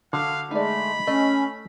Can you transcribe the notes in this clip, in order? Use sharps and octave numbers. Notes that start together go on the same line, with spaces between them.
D3 F#4 A4 F5
G#3 A3 D#4 D5 B5
A3 C#4 D#5